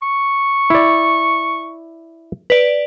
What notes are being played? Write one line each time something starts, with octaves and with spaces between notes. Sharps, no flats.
C#6
E4 D5
B4 D5